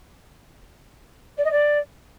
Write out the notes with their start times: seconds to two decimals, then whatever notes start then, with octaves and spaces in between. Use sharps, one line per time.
1.37 D5
1.44 D#5
1.51 D5